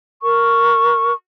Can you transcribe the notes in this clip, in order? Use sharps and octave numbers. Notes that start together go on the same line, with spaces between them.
A#4 C#6